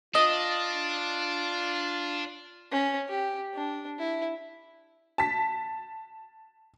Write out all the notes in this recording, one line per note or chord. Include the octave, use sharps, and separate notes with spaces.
D4 F4 D#5
C#4
G4
D4
E4
A5 B6